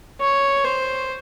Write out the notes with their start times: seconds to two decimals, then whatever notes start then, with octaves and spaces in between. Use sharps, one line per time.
0.21 C#5
0.64 C5